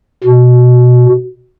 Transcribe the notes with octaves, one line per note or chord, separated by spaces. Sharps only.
B2